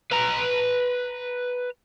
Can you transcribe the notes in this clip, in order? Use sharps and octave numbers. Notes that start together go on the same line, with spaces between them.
B4 A#5